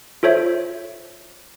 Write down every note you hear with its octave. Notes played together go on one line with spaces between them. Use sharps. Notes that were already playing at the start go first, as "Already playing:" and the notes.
F4 A4 C5 C#5 E5